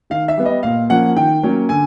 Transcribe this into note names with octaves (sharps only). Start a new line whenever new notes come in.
D#3 F5
E5
G3 B3
D#5
A#2 F5
F3 A#3 C#4 F#5
D#3 G5
F#3 A#3 C#4
D3 G#5